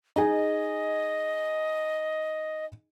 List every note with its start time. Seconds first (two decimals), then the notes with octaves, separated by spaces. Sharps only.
0.16 D#4 G#4 D#5 G#5